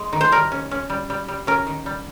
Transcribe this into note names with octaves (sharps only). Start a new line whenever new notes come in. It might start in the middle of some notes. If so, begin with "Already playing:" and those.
Already playing: G#3
D#3
C5
G3 A#4
C#4
C#4
G3
G3
G3
C#4 A#4
D#3
G3